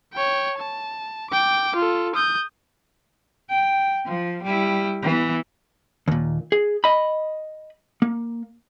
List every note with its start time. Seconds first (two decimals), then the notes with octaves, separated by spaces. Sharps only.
0.13 C#5 G5
0.58 A5
1.30 G5 D6
1.75 F4 A4
2.15 D#6 G6
3.49 G5
4.06 F3
4.43 G3 E4
5.03 E3 B3
6.08 D#2 A#2
6.52 G#4
6.84 D#5 B5
8.02 A#3